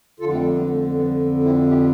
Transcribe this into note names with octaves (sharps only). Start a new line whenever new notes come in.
F2 D3 F4 A4
A3 C4
G3 B3
F3 A3
G3 B3
C4 E4
E4 G4